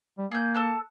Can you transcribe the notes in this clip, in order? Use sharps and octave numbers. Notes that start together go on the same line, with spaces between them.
G3
A#3 G#4 G6
A4 A5 F#6